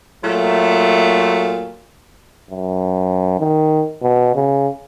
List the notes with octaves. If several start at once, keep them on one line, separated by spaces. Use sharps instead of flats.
A#2 F#3 A3
F#2
D#3
B2
C#3